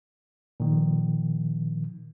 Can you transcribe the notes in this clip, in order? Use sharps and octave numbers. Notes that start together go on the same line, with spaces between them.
A#2 D#3 F3